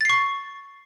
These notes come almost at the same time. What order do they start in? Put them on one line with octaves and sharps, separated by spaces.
A6 C7 C#6